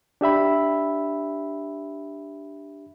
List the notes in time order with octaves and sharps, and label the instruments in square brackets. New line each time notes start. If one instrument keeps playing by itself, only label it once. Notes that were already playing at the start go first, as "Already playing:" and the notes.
[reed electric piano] D4 G4 E5 B5